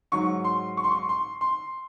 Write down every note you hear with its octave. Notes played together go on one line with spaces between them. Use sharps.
G#2 F#3 C#6
C6
C#6
C6
C#6
C6
C6